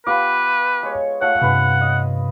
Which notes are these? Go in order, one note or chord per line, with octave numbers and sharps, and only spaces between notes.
B3 F4 G4 B4 D6
G#3 C#5
A3 F4 C#5 F#5
G2 C3 B3 B4 G#5
D#5